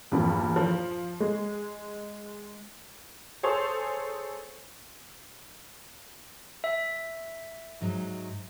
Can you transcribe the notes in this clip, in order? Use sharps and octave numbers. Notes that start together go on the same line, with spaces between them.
E2 G2 A#2 F3
F3
G#3
G#4 A4 C5 C#5 C6
E5
G#2 F#3 D#4